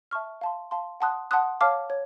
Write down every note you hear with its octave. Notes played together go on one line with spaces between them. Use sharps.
E5 A5 C#6 F6
F5 A5 C6
F5 A5 C6
F#5 A5 C6 D#6 F#6
F#5 A5 C6 D#6 F#6
C#5 F5 A5 D6 F6
C#5